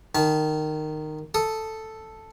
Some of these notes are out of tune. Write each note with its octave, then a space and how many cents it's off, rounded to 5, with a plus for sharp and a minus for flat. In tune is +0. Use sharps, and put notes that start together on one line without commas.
D#3 -15 A5 -35
A4 +0 D#6 +0